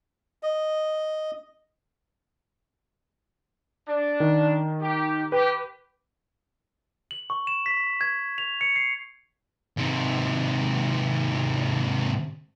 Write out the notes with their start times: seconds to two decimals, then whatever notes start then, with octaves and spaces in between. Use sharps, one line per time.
0.43 D#5
3.87 D4
4.20 D#3
4.82 G4
5.32 G4 B4
7.11 F#7
7.30 C#6
7.47 E7
7.66 B6
8.01 G#6
8.38 F7
8.61 C#7
8.76 C7
9.77 G#2 C3